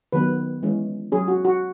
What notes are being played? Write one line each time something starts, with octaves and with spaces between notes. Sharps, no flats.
D#3 F#3 B3 B4
E3 G#3 C#4
F#3 C#4 G#4
F#4
F#4